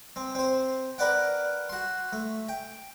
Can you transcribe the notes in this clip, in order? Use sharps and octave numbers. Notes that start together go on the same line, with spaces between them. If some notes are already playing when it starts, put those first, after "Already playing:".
C4
C4 C5
A#4 B4 D5 F#5 G5
F#4 C6
A3
G5